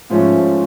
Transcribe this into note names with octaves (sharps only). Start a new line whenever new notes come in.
G#2 F3 A3 C#4